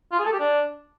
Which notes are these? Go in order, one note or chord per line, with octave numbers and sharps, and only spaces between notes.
F4
G#4
A4
G4
D4